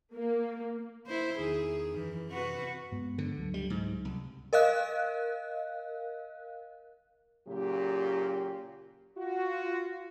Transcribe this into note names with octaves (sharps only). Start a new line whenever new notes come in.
A#3
E4 C5
E2 D#3 D#4 G#4
F#2 E3
C3 F#4 B4
G2 G#3 B3
D3
C#2 F#3 A3
G3
G#2
C2
A#4 D#5 F5 F#6
A#2 C#3 F#3 G4
F4 F#4